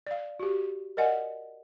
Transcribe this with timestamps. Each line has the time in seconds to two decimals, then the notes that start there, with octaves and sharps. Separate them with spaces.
0.07 D5 F5
0.40 F#4 G4
0.97 A#4 D5 D#5 F#5 G#5